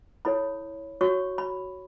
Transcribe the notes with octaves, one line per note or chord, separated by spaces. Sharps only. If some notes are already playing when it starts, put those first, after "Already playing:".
E4 A4 C#5 B5
F#4 C#5 C#6
B5